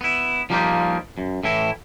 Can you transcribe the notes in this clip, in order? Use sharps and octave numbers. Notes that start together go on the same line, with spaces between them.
B3 E4
F3 G3 A#3 D#4 F4 G4
F#2
A2 E3 E4